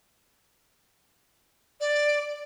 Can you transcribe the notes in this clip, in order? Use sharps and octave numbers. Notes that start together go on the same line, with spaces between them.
D5